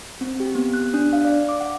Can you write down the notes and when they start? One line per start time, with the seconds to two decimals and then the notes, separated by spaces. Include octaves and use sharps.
0.21 C4
0.40 G4
0.55 B3
0.74 F#6
0.94 D4
1.13 F5
1.25 D5
1.49 D6
1.60 F#5